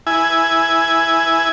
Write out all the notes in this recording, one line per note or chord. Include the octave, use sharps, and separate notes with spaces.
E4 G#5